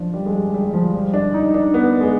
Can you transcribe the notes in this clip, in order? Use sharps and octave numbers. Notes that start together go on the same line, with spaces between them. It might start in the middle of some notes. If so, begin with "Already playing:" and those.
Already playing: F3 D4
G3
G#3
G3
G3
G3
F3
G3
D4
D#4
D4
B3
G#3